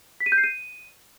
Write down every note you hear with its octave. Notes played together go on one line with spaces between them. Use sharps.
B6
D#7
G6
C7
D#7